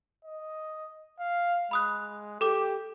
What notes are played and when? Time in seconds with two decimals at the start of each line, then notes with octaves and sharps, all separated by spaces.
0.25 D#5
1.19 F5
1.71 G#3 B5 D#6 F#6
2.41 G4 A4 D6